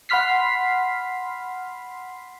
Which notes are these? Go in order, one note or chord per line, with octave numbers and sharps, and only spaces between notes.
F#5 B5 C6 F6 B6 C7